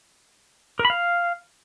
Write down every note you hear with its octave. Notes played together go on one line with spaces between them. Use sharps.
A#4
B5
F5